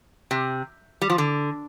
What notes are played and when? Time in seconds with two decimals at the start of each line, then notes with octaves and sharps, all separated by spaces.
0.31 C3
1.01 G3
1.10 F3
1.18 D3